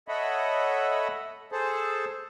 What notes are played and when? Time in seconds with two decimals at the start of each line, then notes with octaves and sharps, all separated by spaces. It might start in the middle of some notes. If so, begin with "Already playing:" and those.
0.08 A4 C#5 D#5 E5 F#5 B5
1.52 G#4 A4 C5 A5